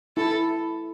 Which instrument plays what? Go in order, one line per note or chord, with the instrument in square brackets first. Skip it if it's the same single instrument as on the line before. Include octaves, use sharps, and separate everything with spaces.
[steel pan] E4 [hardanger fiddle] A4